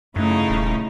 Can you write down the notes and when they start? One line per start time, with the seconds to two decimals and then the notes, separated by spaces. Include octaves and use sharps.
0.16 F#2 C#3 A3 D#4 E4
0.50 D#1